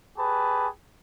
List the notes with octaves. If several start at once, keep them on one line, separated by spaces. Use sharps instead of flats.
G4 G#4 B4 A5